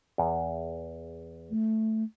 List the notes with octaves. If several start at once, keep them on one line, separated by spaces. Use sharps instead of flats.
E2
A3